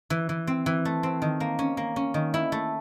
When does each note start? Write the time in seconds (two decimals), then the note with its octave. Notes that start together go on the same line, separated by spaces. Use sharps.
0.10 E3
0.29 E3
0.47 C4
0.66 E3
0.85 A3
1.03 C4
1.22 D#3
1.40 A#3
1.59 C#4
1.77 A#3
1.96 C#4
2.14 D#3
2.34 E4
2.52 A3